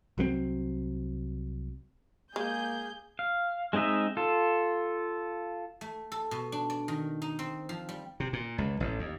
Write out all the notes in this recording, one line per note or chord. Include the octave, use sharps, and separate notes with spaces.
C2 F#3 G#3 C4
G#3 A#3 G#4 G6
F5
G#3 C4 D#4 D#5 E5
F4 A4
A3
A4
B2
D4
D5
D#3
D#4
C4
F3
G3
C3
A#2
C#2
A1
D#2